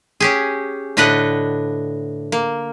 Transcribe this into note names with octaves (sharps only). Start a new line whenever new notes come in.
C#4 G4 G#4
A2 D3 D4 B4 D#5 F#5
A#3